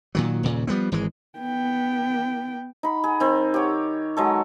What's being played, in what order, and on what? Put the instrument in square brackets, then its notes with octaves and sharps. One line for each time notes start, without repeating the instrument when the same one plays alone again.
[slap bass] A#2 D#3 F#3
D#1 A#2 C#3
F3 G3 B3 C4
G#1 E3 G#3
[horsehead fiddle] B3 G5
[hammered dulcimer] D#4 B5
G#4
D#3 C4
G4 C#5
F#3 G#3 A4